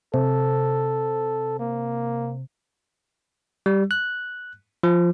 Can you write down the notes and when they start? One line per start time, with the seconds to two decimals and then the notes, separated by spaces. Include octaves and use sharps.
0.14 C3 A4
1.59 A#3
3.66 G3
3.91 F#6
4.83 F3